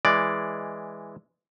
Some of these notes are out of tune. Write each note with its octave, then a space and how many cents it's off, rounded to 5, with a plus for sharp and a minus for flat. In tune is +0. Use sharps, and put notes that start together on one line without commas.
E3 +0 G#3 +0 D5 +0